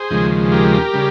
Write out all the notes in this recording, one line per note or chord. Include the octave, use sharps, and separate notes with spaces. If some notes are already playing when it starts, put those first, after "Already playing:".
Already playing: G#4 C5
D#2 C#3 F3 G#3
G4 A#4
C#3 G3